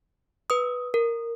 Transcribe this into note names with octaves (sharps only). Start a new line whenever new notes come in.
B4 D#6
A#4